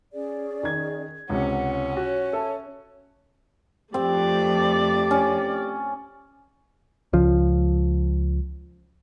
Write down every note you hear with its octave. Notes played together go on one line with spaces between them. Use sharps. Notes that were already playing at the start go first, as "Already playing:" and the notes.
C#4 G#4 D5
D#3 G#6
C#2 C3 C#4 F#5
F#4 C#5
A4 E5
F2 A3 C4 G4 D5
C#4
C#2 F3